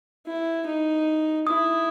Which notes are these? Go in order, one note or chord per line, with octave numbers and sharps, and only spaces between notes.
E4
D#4
E4 D#6